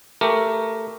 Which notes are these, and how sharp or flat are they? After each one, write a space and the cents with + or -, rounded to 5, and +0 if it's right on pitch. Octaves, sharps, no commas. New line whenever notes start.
A3 +15 G4 +0 A#4 +5